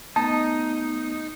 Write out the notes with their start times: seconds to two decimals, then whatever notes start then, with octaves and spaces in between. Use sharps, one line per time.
0.16 A3 B3 D#4 D#5 A5